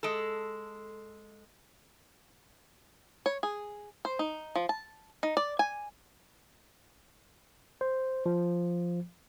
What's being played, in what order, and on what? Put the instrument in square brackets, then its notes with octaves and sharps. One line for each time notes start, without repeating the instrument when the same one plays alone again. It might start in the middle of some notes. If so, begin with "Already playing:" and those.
[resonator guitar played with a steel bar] G#3 A4
[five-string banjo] C#5
G#4
C5
D#4
F3
A5
D#4
D5
G#5
[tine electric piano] C5
F3